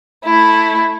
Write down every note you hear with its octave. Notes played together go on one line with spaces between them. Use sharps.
A3 E4